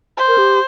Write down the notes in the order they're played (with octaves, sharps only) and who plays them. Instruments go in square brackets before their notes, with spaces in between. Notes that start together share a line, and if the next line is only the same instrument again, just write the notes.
[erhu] C5
[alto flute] A#4
G4